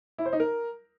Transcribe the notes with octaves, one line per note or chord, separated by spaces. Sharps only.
E4
C5
D#4
A#4